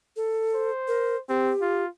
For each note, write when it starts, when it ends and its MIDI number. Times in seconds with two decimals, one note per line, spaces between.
0.16 0.70 69
0.54 1.20 72
0.88 1.16 70
1.29 1.53 60
1.29 1.83 67
1.62 1.88 65